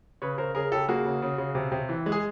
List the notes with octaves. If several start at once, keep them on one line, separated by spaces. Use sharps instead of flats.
C#3 B4 C#5
C#3 A#4 C5
C#3 G#4 A#4
C#3 G4 A4
A#3 F#4 G#4
C#3
C#3
C#3
C3
C3
E3
G#3
G#4